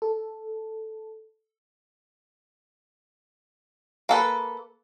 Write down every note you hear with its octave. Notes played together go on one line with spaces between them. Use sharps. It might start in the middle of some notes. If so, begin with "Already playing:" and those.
A4
A#3 A4 B4